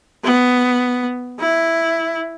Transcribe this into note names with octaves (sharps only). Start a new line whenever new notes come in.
B3
E4